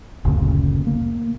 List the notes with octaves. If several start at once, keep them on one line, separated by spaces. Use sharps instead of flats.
F#1 D2 A#2 C#3
A#3